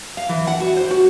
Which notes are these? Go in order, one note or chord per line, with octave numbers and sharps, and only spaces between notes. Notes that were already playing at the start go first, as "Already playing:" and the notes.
F5
E3
F#5
F#4
C5
F#4